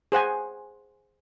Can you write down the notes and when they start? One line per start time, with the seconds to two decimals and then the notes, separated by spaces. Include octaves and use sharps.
0.12 G#4 C5 F#5 G#5